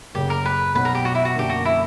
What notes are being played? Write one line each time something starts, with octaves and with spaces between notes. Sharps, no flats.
F#1 F#2 C#3 G4
A#4
B4
B1 B2 F#3 B3 B4
A#4
G4
F#4
E4
F#4
F#2 D3 A#3 D4 G4
F#4
E4